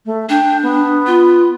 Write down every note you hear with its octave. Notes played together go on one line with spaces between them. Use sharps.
A3
D4 G5
B3
F4